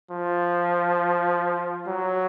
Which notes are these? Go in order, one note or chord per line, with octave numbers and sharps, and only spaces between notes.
F3
F#3